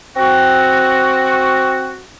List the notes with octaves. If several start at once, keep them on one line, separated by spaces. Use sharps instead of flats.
C4 F#4